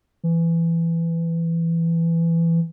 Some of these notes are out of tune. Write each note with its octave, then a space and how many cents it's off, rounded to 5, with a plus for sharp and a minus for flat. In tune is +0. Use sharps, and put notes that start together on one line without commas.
E3 +15